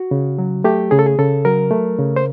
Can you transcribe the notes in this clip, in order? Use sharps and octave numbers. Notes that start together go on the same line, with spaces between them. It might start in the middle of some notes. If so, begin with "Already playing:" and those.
Already playing: F#4
C#3
F#3
A3 G4
C#3 G#4
A4
G#4
C#3 A4
F#3 A#4
A3
C#3
C5